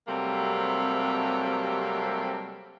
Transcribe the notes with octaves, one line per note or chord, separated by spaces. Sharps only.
C3 F#3 G3 A3 A#3 C4